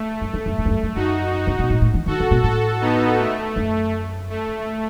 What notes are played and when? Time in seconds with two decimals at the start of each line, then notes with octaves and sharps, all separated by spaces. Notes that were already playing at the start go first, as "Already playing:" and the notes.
Already playing: A3
0.21 F#2
0.33 E2
0.46 F#2
0.58 F#2
0.65 E2
0.70 F#2
0.83 F#2
0.95 F#2 D#4 F#4
1.33 D#4 F#4
1.47 C#3
1.59 B2
1.70 A2
1.81 A2
1.94 E3
2.06 D#3 F#4 A4
2.20 C#3
2.31 B2
2.44 A2 F#4 A4
2.81 B3 D#4
3.18 A3
3.56 F#2
4.30 A3